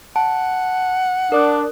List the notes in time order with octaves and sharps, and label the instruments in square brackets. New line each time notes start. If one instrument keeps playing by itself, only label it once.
[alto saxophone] F#5 [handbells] A5
[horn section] D4 [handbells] A#4 F#6